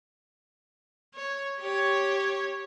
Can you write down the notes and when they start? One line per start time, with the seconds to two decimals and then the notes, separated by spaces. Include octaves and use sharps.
1.15 C#5
1.59 G4 C#5